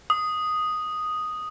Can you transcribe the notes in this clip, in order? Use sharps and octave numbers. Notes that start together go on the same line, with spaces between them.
D#6